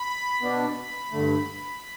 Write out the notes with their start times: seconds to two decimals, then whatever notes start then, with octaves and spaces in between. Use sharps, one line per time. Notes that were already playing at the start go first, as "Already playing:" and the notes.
Already playing: B5
0.41 B2 B3 D4
1.11 G2 D3 A3